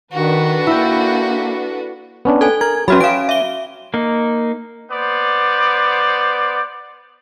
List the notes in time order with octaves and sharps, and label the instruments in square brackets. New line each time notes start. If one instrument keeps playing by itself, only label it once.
[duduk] D#3 [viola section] D4 A4 B4 [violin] F#4
[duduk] A#3 [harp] E4 G5
[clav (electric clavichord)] B3 C#4 D4
[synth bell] A4 G#5
[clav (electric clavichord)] A#4 [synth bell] G#6
[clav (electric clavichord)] F#3 [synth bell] C#4 F#4 B5
[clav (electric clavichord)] C#4 [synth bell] F5 D7
[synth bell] E5 G7
[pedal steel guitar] A#3 D#4
[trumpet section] B3 C5 D5